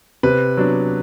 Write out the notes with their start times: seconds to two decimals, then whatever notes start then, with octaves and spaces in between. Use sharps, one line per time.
0.23 C3 B4
0.57 F#3 B3 D4